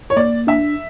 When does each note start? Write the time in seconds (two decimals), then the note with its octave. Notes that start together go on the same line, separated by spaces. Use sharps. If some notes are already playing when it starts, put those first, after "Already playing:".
0.10 C#5
0.17 A#3 D5
0.47 D4 E5